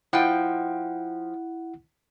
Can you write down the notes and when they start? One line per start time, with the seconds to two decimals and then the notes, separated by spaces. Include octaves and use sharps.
0.13 F3 E4 F#5 G5